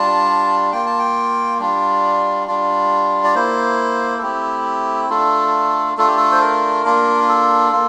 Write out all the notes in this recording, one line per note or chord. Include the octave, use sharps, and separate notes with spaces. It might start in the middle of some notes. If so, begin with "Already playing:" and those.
Already playing: G3 D4 F4 A5
A#3 F4 G5
A5
G5
G3 D4 F4
G3 D4 F4
D5
A#3 E4 C5
A4
A3 C4 E4 G4
A3 D4 F4 A4
A3 D4 F4 A4
G4
A4
C5
A#4
A#3 D4 F4
A4
A#3 F4